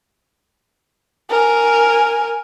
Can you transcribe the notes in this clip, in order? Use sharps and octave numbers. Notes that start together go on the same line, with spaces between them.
A#4 G#5